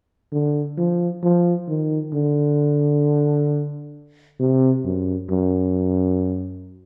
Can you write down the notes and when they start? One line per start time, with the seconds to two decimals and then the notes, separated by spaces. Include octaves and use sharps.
0.32 D3
0.78 F3
1.23 F3
1.68 D#3
2.14 D3
4.40 C3
4.85 F#2
5.30 F#2